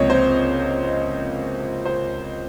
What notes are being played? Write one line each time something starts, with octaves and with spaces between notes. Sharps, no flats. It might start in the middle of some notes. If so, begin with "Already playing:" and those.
Already playing: C#2 C3 F3 A#3 C#5 D#5
C5
C5